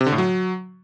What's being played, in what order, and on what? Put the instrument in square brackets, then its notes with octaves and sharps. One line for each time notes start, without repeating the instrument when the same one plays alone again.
[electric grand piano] C3
D3
A2
F#3